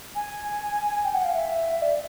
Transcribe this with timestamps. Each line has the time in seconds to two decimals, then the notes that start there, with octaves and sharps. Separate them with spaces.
0.15 G#5
1.04 G5
1.14 F#5
1.25 F5
1.34 E5
1.82 D5